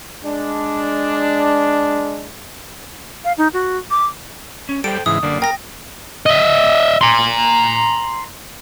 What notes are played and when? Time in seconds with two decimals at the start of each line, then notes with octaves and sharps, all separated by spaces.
0.23 G#3 D4
3.24 F5
3.38 D#4
3.54 F#4
3.91 D6
4.69 C#4
4.84 G3 A4 C5 G5 D7
5.06 C#2 G#2 E3 D#6
5.23 F#2 D3 G3 A#3
5.42 A#4 G5 A#6
6.26 D#5 E5
7.01 A#5 C6